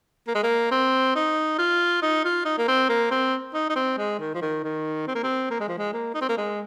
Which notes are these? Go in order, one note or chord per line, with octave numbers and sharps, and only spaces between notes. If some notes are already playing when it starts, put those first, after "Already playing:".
A#3
G#3
A#3
C4
D#4
F4
D#4
F4
D#4
A#3
C4
A#3
C4
D#4
D#4
C4
G#3
D#3
F3
D#3
D#3
C4
A#3
C4
A#3
G#3
F3
G#3
A#3
D#4
C4
A#3
G#3